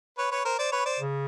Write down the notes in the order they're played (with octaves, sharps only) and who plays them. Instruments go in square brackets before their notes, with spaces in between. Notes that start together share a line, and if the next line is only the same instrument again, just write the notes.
[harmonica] B4 C#5
B4 C#5
A#4 C5
C5 D5
B4 C#5
C5 D5
[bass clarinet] C#3